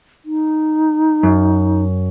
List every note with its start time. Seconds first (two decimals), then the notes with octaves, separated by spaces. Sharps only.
0.25 D#4
1.23 F#2